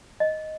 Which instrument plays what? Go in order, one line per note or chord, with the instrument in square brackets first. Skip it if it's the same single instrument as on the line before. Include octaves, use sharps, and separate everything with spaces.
[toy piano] D#5